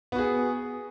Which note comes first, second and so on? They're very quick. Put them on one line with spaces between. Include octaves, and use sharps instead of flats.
B3 F#4 G#4